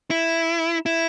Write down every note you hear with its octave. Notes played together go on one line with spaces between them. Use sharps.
E4
E4